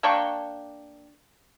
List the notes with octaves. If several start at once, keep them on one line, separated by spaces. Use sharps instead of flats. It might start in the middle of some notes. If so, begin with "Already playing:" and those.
A#3 D4 G5 C#6